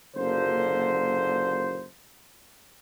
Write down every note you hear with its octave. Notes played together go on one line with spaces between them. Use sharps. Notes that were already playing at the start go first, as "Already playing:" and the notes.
F#1 F#2 A#2 D3 A#3 C5